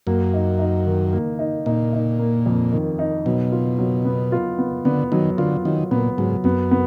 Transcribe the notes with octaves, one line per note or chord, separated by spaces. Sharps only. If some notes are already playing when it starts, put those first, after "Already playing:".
F#2 A#3
D#4
D#4
D#3
A#3
D#4
A#2 D#4
D#4
A#3
F2
D#3
D#4
B2 F#3
F4
F#3
B3
F4
B3
D3 B3
D#3 F#3
D3 F4
D#3 F#3
A#2 B3
G#2 F#3
F#2 B3
B3